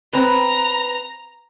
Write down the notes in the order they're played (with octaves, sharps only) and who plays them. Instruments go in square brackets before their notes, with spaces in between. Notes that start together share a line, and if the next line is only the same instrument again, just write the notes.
[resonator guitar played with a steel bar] C4 B4 [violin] A#5